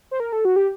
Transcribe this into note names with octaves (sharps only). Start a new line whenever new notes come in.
C5
A#4
A4
F#4
G4